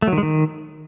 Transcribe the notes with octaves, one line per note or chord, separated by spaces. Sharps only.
A3
F#3
D#3
G#3
D#3